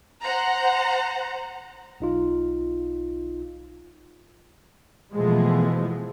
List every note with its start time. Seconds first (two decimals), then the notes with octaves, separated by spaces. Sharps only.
0.22 C5 F#5 A#5
2.00 B1 D#4 F4
5.14 B2 E3 F3 G#3 A3